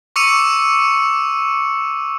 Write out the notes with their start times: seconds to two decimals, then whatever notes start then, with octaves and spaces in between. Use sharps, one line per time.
0.16 C#6 D6 E6 C#7 D#7 F7